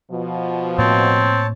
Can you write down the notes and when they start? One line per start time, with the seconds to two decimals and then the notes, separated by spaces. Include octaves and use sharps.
0.11 B2 F3
0.78 A2 A#3 C4 C#5 A5